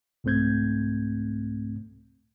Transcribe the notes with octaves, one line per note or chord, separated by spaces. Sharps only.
C2 G#2 A3 C4 G6 G#6